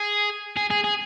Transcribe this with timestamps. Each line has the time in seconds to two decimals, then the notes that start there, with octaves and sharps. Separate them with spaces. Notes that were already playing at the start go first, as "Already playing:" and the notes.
Already playing: G#4
0.57 G#4
0.70 G#4
0.84 G#4